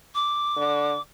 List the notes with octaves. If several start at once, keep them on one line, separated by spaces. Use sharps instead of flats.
D6
D3